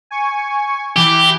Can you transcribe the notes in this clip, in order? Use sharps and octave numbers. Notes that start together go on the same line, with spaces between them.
G#5 C#6
E3 G4